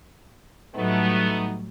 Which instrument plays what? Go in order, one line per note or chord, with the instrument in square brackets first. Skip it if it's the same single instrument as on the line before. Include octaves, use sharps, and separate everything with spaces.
[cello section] A2 F#3 G3 [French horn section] A3 B3 D#4